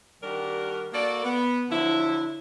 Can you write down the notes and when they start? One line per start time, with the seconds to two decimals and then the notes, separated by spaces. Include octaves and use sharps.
0.22 D#3 G3 D4 F#4 G4 A#4
0.93 A#3 F#4 A4 D5
1.24 B3
1.70 D3 F3 F#3 E4